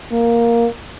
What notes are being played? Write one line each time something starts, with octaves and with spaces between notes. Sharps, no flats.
A#3